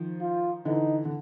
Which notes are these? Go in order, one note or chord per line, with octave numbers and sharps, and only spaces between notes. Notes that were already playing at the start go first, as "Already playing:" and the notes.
Already playing: D#3 F3
F4
D3 E3 D#4
D3